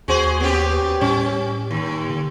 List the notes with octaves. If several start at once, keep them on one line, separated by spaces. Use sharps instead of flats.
D#2 F#4 G#4 C5
B3 C#4 G4
A2 G3 C#4
D#2
D3